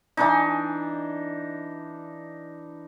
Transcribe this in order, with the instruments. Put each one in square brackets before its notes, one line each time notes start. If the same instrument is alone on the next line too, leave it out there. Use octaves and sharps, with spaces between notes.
[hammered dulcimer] E3 D4 D#4